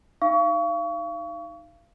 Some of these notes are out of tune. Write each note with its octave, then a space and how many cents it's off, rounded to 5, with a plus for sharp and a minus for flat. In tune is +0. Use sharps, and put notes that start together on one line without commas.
D#4 +0 F5 -30 C#6 +30